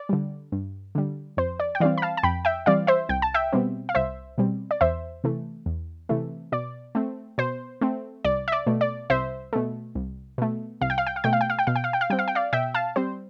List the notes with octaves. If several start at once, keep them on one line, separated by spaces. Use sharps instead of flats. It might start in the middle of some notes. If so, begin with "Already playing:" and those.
Already playing: D5
D3 G3
G2
D3 G3
F2 C5
D5
G5
E3 G3 C4 D5 F5
B5
F5 A5
A5
F2 G5 B5
E5 G5
E3 G3 C4 D5 F5
C5 E5
C2 G5
A5
E5 G5
B2 G3 C4
F5
C2 C5 E5
B2 G3 C4
D5
E2 C5 E5
C3 E3 A3
E2
C3 E3 A3
B2 D5
A3 C4
B2 C5
A3 C4
C2 D5
E5
D5
B2 A3
D5
C2 C5 E5
B2 A3
C2
B2 A3
C2 F5
G5
F5
G5
F5
B2 A3 G5
F5
G5
F5
G5
B2 F5
G5
F5
G5
F5
G3 C4 G5
F5
G5
D5 F5
B2 E5 G5
F5 A5
G3 C4 C5